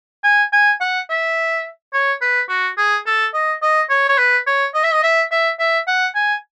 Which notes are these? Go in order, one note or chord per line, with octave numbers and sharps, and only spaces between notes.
G#5
G#5
F#5
E5
C#5
B4
F#4
G#4
A4
D#5
D#5
C#5
C#5
B4
C#5
D#5
E5
D#5
E5
E5
E5
F#5
G#5